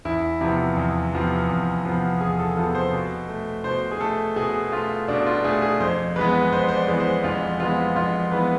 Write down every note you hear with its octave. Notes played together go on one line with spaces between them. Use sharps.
E2 E4
C3 F3 B3 E4
E2
C3 F3 B3
E2
C3 F3 B3
E2 G#4
A4
C3 F3 B3 A4
C5
B2
A3
B2 C5
G#4
A3 A4
B2 G#4
A3 F4
B2 D4
F4
A3 G#4
G#4
F2 C5
E3 G#3 B3 B4
F2 C5
C5
D5
E3 G#3 B3
C5
F2 F4
E3 G#3 B3 F4
F2 F4
E3 G#3 B3 B4